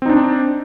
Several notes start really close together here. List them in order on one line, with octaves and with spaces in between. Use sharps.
C4 D#4 D4